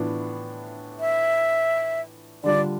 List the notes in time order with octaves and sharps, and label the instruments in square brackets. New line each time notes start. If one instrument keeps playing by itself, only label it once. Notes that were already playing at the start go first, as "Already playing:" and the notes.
Already playing: [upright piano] A2 E3 B3 D4 F4
[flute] E5
[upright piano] D3 G3 D4 F4 [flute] D5